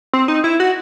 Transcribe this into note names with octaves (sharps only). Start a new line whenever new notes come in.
C4
D#4
E4
F#4